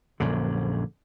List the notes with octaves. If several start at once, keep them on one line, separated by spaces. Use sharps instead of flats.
A#1 F#2 D3